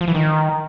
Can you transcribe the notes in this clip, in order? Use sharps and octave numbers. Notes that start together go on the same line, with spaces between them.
F3
E3
D#3